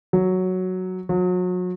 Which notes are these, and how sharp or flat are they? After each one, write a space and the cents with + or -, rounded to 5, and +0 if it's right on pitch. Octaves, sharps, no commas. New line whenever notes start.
F#3 +0
F#3 -35